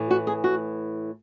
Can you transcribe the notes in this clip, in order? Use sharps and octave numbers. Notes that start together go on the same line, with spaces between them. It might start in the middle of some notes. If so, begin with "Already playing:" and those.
Already playing: A2 E3
F#4
G#4
F#4